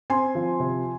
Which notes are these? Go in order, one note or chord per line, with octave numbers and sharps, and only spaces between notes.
C4 G#5 C6
F3
C3